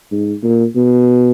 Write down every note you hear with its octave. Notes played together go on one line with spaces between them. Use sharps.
G#2
A#2
B2